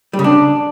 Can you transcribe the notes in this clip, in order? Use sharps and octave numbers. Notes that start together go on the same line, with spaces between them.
G3
C#3
D4